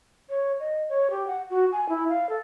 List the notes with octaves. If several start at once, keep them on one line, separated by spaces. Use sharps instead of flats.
C#5
D#5
C#5
G4
F#5
F#4
G#5
E4
F5
A4